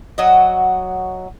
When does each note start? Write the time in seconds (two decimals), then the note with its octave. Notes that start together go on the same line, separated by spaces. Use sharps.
0.18 F#3 F#4 D#5